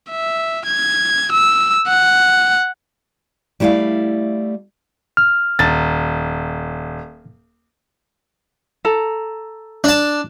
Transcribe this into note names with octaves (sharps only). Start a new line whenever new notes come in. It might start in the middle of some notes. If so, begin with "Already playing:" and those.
E5
G#6
E6
F#5
G3 A3 E4 D5 F5
F6
D#1 A6
A4 A#5
D4 A5